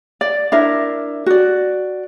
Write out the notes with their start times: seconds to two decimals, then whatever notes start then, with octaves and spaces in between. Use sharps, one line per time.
0.21 D5
0.52 D4 E4 A#4 E5
1.26 F#4 D5